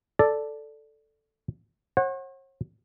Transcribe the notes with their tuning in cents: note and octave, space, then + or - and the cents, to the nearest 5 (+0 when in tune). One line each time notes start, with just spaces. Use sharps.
A4 +0 D5 +0
C#5 -45 F#5 +0